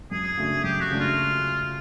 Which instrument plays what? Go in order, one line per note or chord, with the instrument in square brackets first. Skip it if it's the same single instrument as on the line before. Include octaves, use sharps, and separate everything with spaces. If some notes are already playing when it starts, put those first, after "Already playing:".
[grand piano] F#2 [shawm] G#4
[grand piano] C#3 F#3 A3 D4
[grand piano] F#2 [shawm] G4
[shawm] F#4
[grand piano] C#3 F#3 A3 D4
[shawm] F4